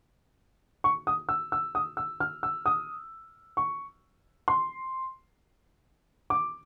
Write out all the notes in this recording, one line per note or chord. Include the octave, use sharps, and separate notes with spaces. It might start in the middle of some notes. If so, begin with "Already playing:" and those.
C#6
D#6
E6
E6
D#6
E6
F6
E6
D#6
C#6
C6
D6